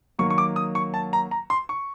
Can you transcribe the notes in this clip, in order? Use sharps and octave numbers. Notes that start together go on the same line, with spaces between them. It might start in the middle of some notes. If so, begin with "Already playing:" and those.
D#3 F#3 A#3 C#6
C#6
D6
D#6
C#6
A5
A#5
A#5
C6
C#6